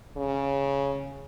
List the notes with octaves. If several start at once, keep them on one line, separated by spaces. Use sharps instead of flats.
C#3